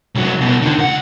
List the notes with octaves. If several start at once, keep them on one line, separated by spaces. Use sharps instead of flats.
C2 F#3
C2 B2
D3 D#3
C#2 F#5